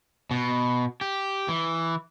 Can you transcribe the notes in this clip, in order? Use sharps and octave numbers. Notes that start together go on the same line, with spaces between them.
B2
G4
E3